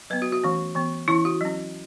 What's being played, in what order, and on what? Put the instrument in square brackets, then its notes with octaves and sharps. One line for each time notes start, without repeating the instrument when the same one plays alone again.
[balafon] F#3 B3 B4
F#4
F#4
E3 A3 C#4
E3 B3
E3 C#4 E4
F#4
F#3 C#4